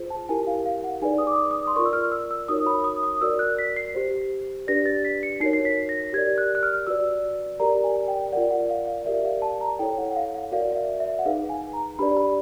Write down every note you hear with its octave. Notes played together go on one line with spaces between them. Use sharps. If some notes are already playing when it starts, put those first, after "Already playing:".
Already playing: F4 G#4 C5
A5
E4 G4 A#4 G#5
F5
F5
F#5
D#4 G#4 B4 D5 G#5
D#6
D6
D#6
C6
F4 A#4 D5 C#6
E6
F6
E6
E6
D#4 F#4 A#4 C#5 D#6
B5
D#6
D#6
F#4 A#4 D5 E6
F#6
B6
C7
G4 C5
D4 G4 B4 D5 A#6
A6
B6
C#7
D#4 F#4 A#4 C#5 C7
C7
B6
A#6
G4 A#4 D5 G#6
F#6
F#6
F6
F#4 B4 D5 E6
G4 A#4 D5 A#5
G#5
G5
F4 A#4 D5 F#5
F#5
F5
F5
G4 A#4 D5 E5
F5
A5
A#5
E4 A4 C#5 G5
F#5
F#5
F5
F#5
F#4 A#4 D5 F5
E5
E5
F#5
D#4 G#4 B4 F5
G#5
A#5
D4 G4 B4 D5 B5
B5